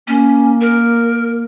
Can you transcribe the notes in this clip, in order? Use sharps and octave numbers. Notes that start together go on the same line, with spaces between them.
A#3 C#4
A#4